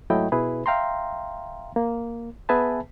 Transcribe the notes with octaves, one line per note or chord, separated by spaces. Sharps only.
G#2 F#3 A3 E4 D#5 G5
B2 E4 G#4 B4
E5 F5 G5 A#5 C6
A#3
B3 G#4 B4 E5 G#5 A5